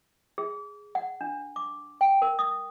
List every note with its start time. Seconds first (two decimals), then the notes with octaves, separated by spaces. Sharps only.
0.38 G#4
0.95 F#5
1.21 D4
1.56 D6
2.01 G5
2.22 A#4
2.39 D#6